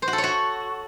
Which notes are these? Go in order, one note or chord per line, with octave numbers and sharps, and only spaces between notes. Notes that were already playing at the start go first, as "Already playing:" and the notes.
C5
F#4
A4
C#5
F#4